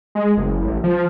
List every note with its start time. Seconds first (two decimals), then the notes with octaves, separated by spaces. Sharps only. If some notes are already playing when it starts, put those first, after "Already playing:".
0.15 G#3
0.37 F#1
0.65 A1
0.84 F3